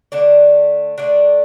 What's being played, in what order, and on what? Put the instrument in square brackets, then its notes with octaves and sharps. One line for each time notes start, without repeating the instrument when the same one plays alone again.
[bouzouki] D3 A3 D4 D5
D3 A3 D4 D5